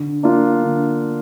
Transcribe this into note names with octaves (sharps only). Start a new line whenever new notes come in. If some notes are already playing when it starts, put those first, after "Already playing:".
Already playing: D3
A#3 D4 F4
D3